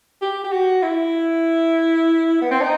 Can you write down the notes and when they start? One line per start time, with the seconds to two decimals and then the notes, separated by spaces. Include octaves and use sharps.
0.22 G4
0.44 G4
0.52 F#4
0.82 E4
2.42 B3
2.51 C4
2.61 D#4